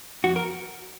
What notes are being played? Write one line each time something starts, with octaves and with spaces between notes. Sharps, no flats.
F2 F#4
A#4